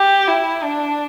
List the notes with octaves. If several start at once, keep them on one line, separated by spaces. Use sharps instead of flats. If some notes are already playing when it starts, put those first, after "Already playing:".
Already playing: G4
E4
D4